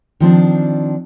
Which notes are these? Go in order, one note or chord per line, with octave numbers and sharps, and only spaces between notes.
D#3 F3 C4 D4